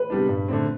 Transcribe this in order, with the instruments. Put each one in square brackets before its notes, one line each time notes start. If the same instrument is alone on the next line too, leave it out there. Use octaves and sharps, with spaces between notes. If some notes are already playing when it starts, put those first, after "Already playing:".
Already playing: [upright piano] B4
[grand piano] C3 G3 B3 D4
G2
D3 A3 C4